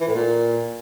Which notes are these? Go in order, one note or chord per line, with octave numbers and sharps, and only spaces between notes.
E3
A2
A#2